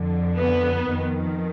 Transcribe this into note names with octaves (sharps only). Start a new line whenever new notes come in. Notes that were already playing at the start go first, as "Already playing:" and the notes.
Already playing: F2 D3
B3
F2 D#3